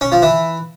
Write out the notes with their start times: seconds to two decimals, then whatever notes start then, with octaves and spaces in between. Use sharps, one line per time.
0.01 C#4
0.12 F3
0.22 E3